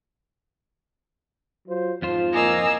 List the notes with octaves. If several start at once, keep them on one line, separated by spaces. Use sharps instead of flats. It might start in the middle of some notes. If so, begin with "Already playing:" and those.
F#3 F4 C5
F2 G#2 F3 F4 C5
A#3 D#5 G#5 E6